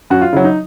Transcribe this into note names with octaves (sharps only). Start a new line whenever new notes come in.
F#2 F#4
F4
C#3 F#3 E4
D#4